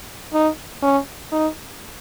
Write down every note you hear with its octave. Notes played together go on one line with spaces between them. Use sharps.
D#4
C#4
D#4